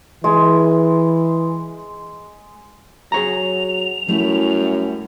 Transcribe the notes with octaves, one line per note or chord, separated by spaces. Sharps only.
E3 G#3
F#3 G#4 C#5 A#5 F7
F#2 G3 A3 E4